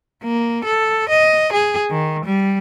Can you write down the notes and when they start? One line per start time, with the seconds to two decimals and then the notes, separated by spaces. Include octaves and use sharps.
0.23 A#3
0.65 A4
1.09 D#5
1.53 G#4
1.90 D#3
2.25 G3